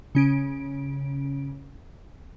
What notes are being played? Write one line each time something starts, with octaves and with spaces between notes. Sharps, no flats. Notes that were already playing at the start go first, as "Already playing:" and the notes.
C#3 C#4 D7